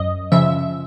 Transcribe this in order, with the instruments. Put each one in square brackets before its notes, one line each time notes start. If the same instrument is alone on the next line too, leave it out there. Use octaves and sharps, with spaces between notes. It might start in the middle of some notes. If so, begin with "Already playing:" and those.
Already playing: [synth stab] F#2 D#5
C#3 F3 E5